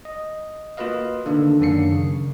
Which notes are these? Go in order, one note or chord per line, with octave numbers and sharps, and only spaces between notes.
D#5
A#3 F4 F#4 B4 D#5 F5
D3 D#3 A#3 D4 A4
F#2 D#3 A#3 D4 C7 C#7
C#3